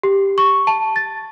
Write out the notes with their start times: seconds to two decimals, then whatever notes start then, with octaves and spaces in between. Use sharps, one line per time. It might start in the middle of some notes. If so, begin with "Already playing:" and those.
0.03 G4
0.38 C#6
0.67 A5
0.96 A6